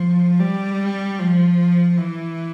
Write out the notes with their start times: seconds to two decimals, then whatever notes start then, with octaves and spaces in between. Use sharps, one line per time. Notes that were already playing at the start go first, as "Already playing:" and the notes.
Already playing: F3
0.40 G3
1.19 F3
1.97 E3